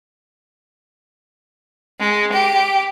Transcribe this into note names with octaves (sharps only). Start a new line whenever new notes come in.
G#3
G4